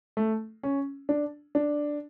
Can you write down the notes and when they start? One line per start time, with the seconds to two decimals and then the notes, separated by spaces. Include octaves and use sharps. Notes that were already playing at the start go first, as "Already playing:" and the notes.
0.17 A3
0.63 C#4
1.09 D4
1.55 D4